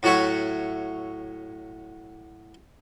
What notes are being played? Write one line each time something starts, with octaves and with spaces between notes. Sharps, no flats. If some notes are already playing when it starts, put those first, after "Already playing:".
A2 F#3 F#4 C#5 E5